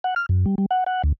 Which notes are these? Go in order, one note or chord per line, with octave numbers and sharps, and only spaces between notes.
F#5
F6
F#2
G3
G3
F#5
F#5
D2